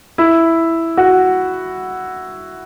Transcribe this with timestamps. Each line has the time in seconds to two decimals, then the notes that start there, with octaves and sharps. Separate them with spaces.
0.18 E4
0.97 F#4